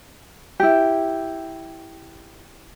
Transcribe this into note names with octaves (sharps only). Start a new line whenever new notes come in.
E4 G4